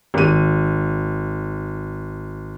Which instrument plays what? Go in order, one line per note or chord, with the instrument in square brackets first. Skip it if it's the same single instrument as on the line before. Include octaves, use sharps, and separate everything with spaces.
[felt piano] G#1 D#7